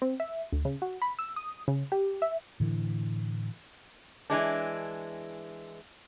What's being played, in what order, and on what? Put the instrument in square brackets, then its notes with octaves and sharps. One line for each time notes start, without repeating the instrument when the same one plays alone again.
[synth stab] C4
E5
D2
C#3
F#4
B5
E6
D#6
C#3
G4
E5
[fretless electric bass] A2 D3 E3
[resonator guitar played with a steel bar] E3 G#3 D4